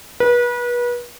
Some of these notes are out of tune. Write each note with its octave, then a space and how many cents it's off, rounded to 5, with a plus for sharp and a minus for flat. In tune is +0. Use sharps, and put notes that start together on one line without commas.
B4 -35